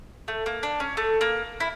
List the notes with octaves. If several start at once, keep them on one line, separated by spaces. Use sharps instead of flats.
A3
A#3
D4
C#4
A3
A#3
E4